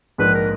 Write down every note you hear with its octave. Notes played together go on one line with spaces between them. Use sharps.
A#1 G#2 F3 A#3 D#4 B4
A#4